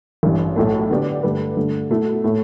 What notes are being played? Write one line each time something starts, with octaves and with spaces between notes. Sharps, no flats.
A1 G2 E3
B1 A2 A3
D3 B3 G4 D5
G2 D3 A3 G4 B4
G2 D3 A3
B2 A3 E4
A2 A3